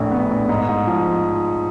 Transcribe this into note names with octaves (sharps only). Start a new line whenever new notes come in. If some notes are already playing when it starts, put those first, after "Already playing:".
Already playing: A#1 A2
B3
A#1
G#2
G#2
F3